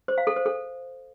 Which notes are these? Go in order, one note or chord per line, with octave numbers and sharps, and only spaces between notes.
C5
F5
A4
C5
A4